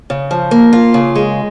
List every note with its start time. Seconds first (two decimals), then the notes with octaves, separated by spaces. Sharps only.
0.10 C#3
0.31 F3
0.51 A#3
0.73 F4
0.94 C#3
1.15 G#3